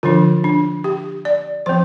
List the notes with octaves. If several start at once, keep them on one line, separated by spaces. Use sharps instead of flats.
D3 F3 D4 F4
D4
G4
D5
F3 C4 C5